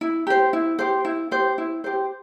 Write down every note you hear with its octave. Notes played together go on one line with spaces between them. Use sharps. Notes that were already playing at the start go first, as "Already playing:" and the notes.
E4
G4 C5
E4
G4 C5
E4
G4 C5
E4
G4 C5